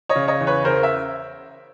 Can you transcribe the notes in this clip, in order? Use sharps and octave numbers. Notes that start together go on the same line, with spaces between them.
C#5 D#5
C#3
C#5 D#5
E2
B4 C#5
C#3 A#4 C5
E5